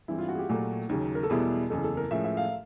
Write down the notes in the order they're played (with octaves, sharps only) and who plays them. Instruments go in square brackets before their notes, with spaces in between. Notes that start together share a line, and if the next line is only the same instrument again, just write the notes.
[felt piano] G2 E3 G#3 C4 [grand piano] E4
[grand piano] F4
F#4
G#4
G4
[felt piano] A#2 F#3 A3
D#2 C#3 F#3
[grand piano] A#4
A4
[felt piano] E2 B2 G3 B3 E4 [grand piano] G#4
[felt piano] F#1 E2 C#3 [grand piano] A4
[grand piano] A4
A#4
[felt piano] A2 F3 G#3 C#4 [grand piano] E5
[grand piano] E5
F5